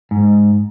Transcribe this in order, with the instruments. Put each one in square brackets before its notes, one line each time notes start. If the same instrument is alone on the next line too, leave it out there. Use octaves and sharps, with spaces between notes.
[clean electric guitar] G#2